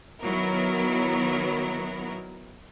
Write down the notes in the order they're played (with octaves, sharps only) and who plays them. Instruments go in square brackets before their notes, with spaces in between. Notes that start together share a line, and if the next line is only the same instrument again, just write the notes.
[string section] D#3 F#3 B3 E4 A#4